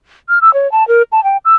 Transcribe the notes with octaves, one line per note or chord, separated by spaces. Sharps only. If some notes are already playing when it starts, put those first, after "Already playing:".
F6
E6
C#5
A5
A#4
A5
G5
E6